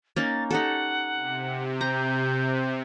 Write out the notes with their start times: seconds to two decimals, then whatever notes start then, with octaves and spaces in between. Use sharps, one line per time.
0.16 A#3 C#4 D#4 A6
0.51 D#4 G4 A4 F#5
1.12 C3
1.81 A#5 G6